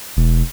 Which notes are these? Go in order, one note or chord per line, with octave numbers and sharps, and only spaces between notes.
E1